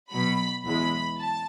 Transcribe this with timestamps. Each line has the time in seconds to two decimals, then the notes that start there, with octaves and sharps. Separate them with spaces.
0.11 B2 F#3 B5
0.65 E2 B2 G#3 B5
1.18 A5